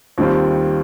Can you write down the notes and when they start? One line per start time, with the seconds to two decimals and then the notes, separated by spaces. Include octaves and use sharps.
0.18 D#2 D#3 G3 C4 F4